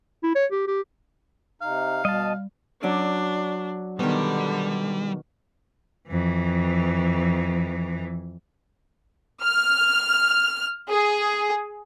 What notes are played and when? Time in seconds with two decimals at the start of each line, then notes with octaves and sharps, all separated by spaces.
0.23 E4
0.35 C#5
0.52 G4
0.68 G4
1.62 C3 D#4 F5
2.05 B2 G3 D#5 A5
2.83 F#3 C#4 D4 D5
3.99 B2 D3 D#3 G3
6.08 F2 E3
9.43 F6
10.88 G#4